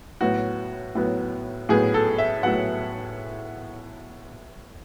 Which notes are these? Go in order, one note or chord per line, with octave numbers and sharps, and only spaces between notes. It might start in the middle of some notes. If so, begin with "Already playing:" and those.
A2 F#3 B3 F#4
A2 F#3 B3
A2 F#3 B3 G#4
A4
E5
A2 F#3 B3 F#5